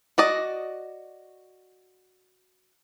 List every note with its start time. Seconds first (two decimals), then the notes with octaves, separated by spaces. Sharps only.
0.18 F#4 D5 D#5